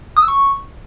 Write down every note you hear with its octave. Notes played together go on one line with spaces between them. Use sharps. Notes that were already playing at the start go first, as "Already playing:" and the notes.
D#6
E6
C#6